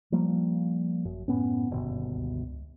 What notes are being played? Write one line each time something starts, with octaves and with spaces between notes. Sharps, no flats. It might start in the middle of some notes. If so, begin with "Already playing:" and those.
F3 G3 A#3
G#1 F#2
F#2 A2 B3 C#4
G1 D#2 B2
C#2